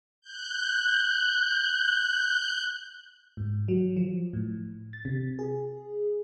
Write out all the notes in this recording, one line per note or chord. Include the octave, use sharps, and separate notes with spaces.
F#6 G6
G#2
F#3
F3
A2
A6
C3
G#4